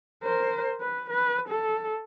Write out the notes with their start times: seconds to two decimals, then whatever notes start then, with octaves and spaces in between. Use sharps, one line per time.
0.24 A#4 C5
0.81 B4
1.10 B4
1.49 A4